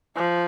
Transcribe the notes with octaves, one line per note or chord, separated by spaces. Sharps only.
F3